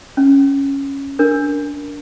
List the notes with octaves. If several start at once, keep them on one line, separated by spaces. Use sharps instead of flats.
C#4
D4 A#4